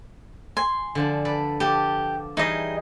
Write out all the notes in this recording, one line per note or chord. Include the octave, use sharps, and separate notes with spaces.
G#5 C6
D3 F3 D5
A4 B4 D5
F3 G4 A4
E3 G3 D#4 G#4 D#5